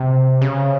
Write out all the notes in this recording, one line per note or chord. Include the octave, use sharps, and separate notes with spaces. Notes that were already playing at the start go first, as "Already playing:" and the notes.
Already playing: C3
C#3